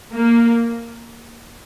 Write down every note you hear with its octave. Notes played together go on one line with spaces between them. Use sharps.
A#3